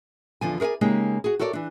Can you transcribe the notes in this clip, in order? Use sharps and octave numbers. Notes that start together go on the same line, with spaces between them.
E2 D3 F3 G#5
G#4 A#4 C#5 D5 G#5
C#3 G#3 A#3 D#4 G4
F#4 G#4
F#4 A4 A#4 C#5 D5
E3 D4